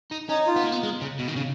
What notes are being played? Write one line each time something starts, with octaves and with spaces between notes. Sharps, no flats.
D#4
C#4 D#4
F4
B3
A#3
B3
G#3
C#3
B2
D#3
C#3